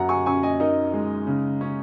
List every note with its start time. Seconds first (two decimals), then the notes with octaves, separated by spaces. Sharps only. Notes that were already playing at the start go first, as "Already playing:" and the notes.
Already playing: F#2 F#5 A#5
0.09 G#5 C#6
0.26 C#4 G#5 C#6
0.43 D#5 G#5
0.60 D#4 A#4 D#5
0.93 G#3
1.27 C#3
1.61 C#4